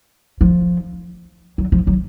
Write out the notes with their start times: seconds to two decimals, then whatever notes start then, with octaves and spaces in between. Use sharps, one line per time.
0.41 F3
1.58 F#3
1.72 F3
1.87 F#3